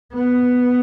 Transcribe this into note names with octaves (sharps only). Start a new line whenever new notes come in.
B3